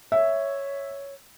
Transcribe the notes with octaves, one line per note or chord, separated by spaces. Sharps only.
C#5 E5